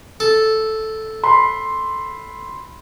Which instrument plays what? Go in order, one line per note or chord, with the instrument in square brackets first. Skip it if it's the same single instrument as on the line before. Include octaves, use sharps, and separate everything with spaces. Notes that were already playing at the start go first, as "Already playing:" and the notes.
[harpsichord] A4
[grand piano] B5 C6